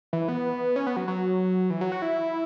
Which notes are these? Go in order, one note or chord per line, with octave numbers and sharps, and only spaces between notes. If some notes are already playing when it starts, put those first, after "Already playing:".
E3
B3
C#4
B3
F#3
F#3
E3
F#3
F#4
E4